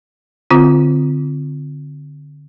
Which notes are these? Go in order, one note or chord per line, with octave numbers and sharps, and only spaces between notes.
D3 C4 F4